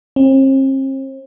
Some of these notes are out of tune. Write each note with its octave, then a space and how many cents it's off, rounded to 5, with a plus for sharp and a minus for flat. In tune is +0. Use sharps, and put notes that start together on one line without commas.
C4 +45